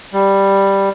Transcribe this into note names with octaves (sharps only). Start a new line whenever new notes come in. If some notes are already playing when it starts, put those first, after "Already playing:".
G3